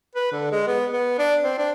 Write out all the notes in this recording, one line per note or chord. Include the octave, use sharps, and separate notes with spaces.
B4
D3
G#3
B3
B3
D4
C4
D4